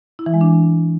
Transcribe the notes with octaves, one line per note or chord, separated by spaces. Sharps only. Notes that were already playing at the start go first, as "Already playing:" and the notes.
E4
E3
G#3
D4